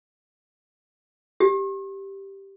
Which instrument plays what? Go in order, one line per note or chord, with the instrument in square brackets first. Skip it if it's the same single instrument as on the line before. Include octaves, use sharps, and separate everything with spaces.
[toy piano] G4